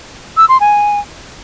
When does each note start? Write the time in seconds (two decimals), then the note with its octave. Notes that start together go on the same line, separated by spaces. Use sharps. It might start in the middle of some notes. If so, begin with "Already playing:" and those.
0.37 E6
0.49 C6
0.60 G#5